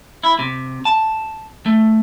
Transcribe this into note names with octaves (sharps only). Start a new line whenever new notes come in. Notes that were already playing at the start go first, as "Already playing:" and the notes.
E4
C3
A5
A3